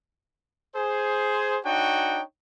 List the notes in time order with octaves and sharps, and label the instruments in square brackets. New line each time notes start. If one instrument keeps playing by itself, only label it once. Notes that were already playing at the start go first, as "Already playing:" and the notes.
[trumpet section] G#4 C5
D4 D#4 F#4 C#5 G5